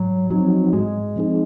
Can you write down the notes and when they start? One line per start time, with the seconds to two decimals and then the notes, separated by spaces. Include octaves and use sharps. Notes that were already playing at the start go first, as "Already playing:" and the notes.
Already playing: G#2 F#3
0.30 F3 F#3 C4 D#4 F#4
0.73 G#2 G#3
1.16 F3 C4 D#4 G#4